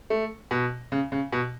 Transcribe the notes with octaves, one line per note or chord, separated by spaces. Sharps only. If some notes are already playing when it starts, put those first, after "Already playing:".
A3
B2
C#3
C#3
B2